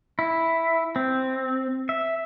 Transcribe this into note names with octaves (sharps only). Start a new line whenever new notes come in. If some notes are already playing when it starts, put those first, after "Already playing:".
E4
C4
E5